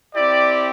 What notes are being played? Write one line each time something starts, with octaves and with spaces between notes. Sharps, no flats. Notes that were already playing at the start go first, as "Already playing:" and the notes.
C4 E4 G4 D5